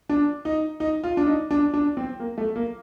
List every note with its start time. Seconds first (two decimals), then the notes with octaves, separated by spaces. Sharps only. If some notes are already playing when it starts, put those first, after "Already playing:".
0.09 D4
0.45 D#4
0.80 D#4
1.04 F4
1.17 D4
1.26 D#4
1.51 D4
1.74 D4
1.97 C4
2.20 A#3
2.38 A3
2.56 A#3